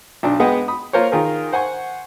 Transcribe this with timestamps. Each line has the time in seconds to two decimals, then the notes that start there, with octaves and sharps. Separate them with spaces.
0.23 B1 D4
0.40 G#3 B3 G#4 D#5 F#5 G5
0.68 B5 D#6
0.93 A#3 F4 A#4 C5 C#5
1.12 D#3 F4 G#4 A#4
1.52 C5 F#5 G#5 C#6